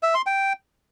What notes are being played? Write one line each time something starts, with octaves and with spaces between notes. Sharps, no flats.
E5
C6
G5